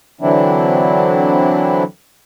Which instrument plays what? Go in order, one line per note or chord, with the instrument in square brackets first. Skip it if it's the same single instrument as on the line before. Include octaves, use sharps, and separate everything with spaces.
[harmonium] D3 E3 F#3 C4 D4 E4